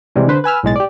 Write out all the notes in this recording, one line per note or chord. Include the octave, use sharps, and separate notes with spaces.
C3 E3 G3 G#3
D3 B4 C5
B4 G#5 E6 F6
B1 A2 G#3 A6
G4 D5